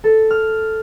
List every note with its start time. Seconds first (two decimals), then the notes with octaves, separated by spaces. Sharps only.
0.04 A4
0.31 F6